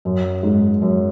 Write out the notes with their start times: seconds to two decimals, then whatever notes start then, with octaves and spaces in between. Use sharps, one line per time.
0.05 F#2
0.43 G#2
0.82 F#2